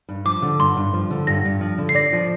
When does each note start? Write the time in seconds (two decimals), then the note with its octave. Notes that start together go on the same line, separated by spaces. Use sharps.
0.09 G2
0.25 F3 D6
0.42 D3
0.59 G2 C6
0.77 G2
0.94 F3
1.11 D3
1.27 G2 A#6
1.45 G2
1.61 F3
1.78 D3
1.89 C7
1.95 D5 A#6
2.13 F3